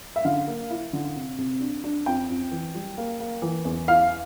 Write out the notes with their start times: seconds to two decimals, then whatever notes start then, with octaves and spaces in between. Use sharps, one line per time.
0.16 E5
0.25 D3 F5
0.48 A#3
0.71 E4
0.93 D3
1.16 C3
1.38 C3
1.60 D4
1.84 D4
2.06 F2 G5
2.29 F2
2.52 E3
2.74 G3
2.98 A#3
3.20 A#3
3.42 E3
3.65 E2
3.88 E4 F5